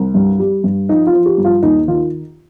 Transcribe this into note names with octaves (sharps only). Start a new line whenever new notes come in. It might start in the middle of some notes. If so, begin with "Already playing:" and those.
Already playing: C2
G2
G3
G2
F3 D#4
F4
F3
G4
G2
F4
D#2 D#4
D#3 F4